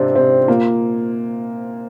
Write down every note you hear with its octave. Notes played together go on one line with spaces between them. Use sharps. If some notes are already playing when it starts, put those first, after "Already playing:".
Already playing: G#2 C3 C4 D4
C3 C4
A#2 A#3